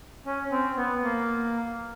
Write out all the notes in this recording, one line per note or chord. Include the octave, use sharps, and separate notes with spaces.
C#4
C4
B3
A#3